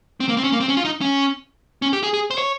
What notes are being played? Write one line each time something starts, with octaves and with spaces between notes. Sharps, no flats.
C4
A#3
C4
C#4
A#3
C4
C#4
F4
D#4
C#4
C#4
G4
G#4
G#4
C5
C#5